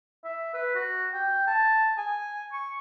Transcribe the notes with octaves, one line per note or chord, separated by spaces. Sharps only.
E5
B4
F#4
G5
A5
G#5
C#6